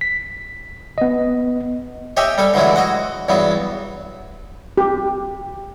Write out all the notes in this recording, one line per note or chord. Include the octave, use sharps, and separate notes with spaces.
B6
B3 D#5
G4 C#5 D#5 E5 G5 G#5
G3 A4 G#5
D3 E3 F#3 G#3 E4
F#4 D#5 F#5
E2 G2 F#3 B3
G4